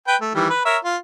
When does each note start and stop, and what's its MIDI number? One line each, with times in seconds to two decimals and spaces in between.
0.07 0.16 71
0.07 0.16 79
0.21 0.29 57
0.35 0.48 51
0.35 0.48 52
0.35 0.48 55
0.49 0.62 71
0.65 0.77 70
0.65 0.77 73
0.65 0.77 76
0.84 0.97 65